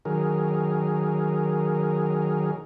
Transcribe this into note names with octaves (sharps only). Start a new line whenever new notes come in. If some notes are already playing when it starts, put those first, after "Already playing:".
D#3 F#3 G#4 A#4